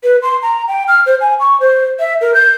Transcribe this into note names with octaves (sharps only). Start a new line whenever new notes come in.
B4
C6
A#5
G5
F6
C5
G#5
C#6
C5
E5
A#4
G6